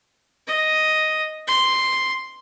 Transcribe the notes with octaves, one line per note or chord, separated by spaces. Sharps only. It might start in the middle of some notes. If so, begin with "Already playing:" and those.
D#5
C6